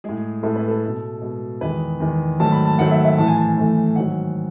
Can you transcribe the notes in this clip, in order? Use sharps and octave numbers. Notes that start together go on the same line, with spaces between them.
A2 G#3 G#4
A2 G#3 A4
B4
A4
B2 G#3
B2 G#3
E2 D#3 G#3 B4
E2 D#3 G#3
G#2 D#3 F#3 A3 A5
B5
A5
G#2 D#3 F#3 A3 F#5
E5
E5
A2 E3 A3 A5
G#5
A5
G#5
A2 E3 A3
G#2 D#3 F#3 F#5